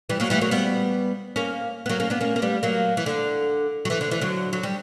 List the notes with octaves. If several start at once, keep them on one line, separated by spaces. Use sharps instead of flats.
E3 G3
F#3 A#3
E3 G3
F#3 A#3
G3 B3
A#3 C#4
B3
F#3 A#3
A#3 C#4
B3 D4
A#3 C#4
A#3
G3 B3
F#3 A#3
E3
D3
F#3
E3
D3
E3
D3 F#3
F#3
G3